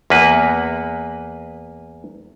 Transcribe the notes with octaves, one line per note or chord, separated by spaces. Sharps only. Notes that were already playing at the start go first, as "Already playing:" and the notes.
E2 A#3 B4